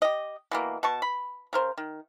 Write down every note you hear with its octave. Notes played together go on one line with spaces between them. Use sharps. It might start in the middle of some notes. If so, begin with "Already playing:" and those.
G4 D#5
B2 E3 A#3
B2 A5 C#6
B5
C#3 A#4 C5
D#3